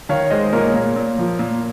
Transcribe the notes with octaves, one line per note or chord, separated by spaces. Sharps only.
D#3 C#5 F5
G#3 C5 D#5
A#2 A#4 C#5
A#2
A#2
F3
A#2